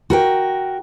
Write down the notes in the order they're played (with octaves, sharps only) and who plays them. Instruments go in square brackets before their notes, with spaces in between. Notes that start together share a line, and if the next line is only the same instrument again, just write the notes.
[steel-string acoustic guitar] F#4 A#4 G5